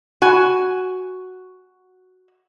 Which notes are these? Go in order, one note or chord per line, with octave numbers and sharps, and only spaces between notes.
F#4 G#5